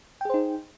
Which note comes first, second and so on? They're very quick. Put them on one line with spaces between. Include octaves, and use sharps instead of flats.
G5 G#4 C5 D#4